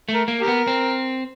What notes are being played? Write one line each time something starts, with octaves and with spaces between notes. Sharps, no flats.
A3
A#4
A#3
G4 A#4
B3
C4